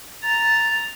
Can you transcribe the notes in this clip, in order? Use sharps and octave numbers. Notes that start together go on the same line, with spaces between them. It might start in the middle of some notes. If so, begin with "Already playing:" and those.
A#5 A6